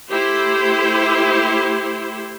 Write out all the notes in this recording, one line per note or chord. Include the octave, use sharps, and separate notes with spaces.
A3 E4 G4 C5